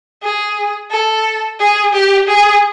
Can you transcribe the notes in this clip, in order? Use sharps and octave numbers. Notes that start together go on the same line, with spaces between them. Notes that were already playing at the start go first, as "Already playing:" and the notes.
G#4
A4
G#4
G4
G#4